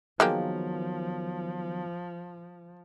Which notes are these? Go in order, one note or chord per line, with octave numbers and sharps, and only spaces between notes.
D#3 F3 F#3 G#3 A#3 B3 G4